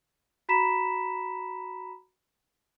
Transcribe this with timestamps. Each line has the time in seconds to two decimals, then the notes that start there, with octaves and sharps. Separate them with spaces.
0.49 F#4 A#5 B5 B6 E7